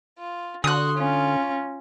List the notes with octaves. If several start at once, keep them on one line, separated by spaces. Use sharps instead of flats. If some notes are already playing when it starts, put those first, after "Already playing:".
F4
D3 F#4 C6 D#6 F#6
C#4 F4